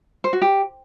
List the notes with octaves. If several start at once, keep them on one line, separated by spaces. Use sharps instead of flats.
C5
F#4
G4